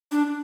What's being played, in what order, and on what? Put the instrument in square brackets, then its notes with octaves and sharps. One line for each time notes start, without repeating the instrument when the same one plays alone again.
[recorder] D4